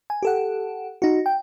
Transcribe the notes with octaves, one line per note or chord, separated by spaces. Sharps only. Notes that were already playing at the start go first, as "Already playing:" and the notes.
G#5
G4 A4 F#5
D#4 F#4
G5